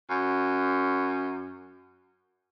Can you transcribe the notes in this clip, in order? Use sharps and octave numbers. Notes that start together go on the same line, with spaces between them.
F#2